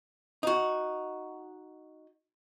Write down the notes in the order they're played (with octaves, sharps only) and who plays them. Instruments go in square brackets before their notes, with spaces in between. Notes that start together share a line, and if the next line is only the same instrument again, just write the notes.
[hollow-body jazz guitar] D#4 F#4